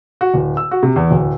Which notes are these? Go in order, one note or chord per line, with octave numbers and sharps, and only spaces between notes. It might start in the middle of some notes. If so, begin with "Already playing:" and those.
F#4
D1
E6
F#4
C3
E2
D1